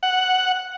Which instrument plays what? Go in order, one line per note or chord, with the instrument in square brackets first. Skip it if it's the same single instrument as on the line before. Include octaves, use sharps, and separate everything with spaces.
[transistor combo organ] F#5